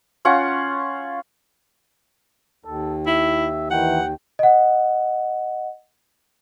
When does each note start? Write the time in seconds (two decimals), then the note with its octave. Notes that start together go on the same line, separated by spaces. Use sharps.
0.25 C#4 F4 F#5 C#6
2.65 D#2 A4
3.07 E4 E5
3.71 D#3 E3 F#5 G5
4.39 D#5 F#5